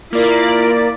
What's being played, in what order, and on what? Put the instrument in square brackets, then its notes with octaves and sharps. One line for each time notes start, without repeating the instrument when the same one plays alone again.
[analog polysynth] A#3 D5 [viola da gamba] E4 [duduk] F4 [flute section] A#4